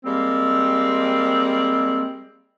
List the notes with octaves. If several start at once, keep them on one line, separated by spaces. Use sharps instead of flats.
G3 G#3 A#3 C4